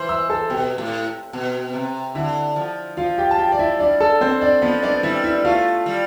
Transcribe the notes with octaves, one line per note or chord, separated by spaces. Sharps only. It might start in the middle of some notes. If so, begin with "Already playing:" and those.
Already playing: E3 B4 C5 C6
E5 E6
A4 A5
B2 G4 G5
A2
B2
C3
D3 E4 E5
F3
F3 F4 F5
G4 G5
A5
G4 G5
D5
E4 E5
G3 D4 D5
A4 A5
C4 C5
D4 D5
F3 B3 B4
D4 D5
G3 E4 E5
E4 E5
A3 F4 F5
G3